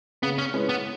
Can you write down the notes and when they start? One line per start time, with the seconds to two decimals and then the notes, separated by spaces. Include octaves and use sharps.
0.22 C#3 B3
0.38 C#4
0.54 G#3 C#4 E4 B4
0.69 B3